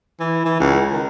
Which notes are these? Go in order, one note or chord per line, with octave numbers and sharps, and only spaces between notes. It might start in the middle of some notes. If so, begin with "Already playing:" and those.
E3
E3
C#2
D#3